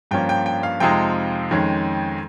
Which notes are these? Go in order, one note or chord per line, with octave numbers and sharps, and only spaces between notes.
G2 F3 A#3 C#4 G5
G5
G5
F5
F2 C3 F3 G#3 D#4 G5
F2 D#3 G#3 C#4